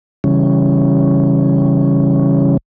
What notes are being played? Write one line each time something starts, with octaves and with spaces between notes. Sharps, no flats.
C#3 E3 G3 C#4